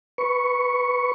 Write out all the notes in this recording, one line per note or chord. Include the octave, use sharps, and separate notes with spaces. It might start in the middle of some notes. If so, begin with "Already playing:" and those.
B4 C#6